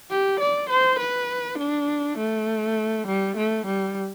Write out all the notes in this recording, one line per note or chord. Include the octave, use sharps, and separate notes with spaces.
G4
D5
C5
B4
D4
A3
G3
A3
G3